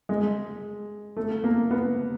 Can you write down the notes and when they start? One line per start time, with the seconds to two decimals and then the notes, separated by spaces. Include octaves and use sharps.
0.09 G#3
1.17 A3
1.44 A#3
1.71 B3